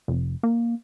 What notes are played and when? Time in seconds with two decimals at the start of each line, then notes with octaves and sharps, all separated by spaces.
0.08 F1
0.43 A#3